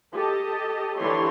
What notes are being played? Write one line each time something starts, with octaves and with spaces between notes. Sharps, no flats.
G4 A4 D#5 A5
D3 E3 E4 G4 C#5 C6